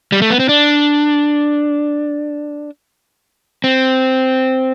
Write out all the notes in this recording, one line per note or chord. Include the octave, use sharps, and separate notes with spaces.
G3
A3
B3
C4
D4
C4